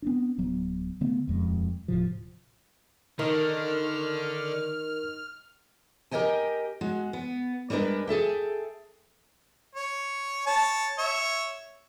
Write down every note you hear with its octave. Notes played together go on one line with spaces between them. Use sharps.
B3 C4 D4
D1 F#3 B3
D3 A3 B3
D#1 F2 G#3
D#1 A2 C3 F3
D3 D#3 D#4 A#4 D#5 F6
G4 A#4 C#5 D#5 G5 G#5
G#3 F#4
B3
G3 G#3 D4 A#4 B4
G#4 A4 E5 G5
C#5
C#5 A5
C#5 E5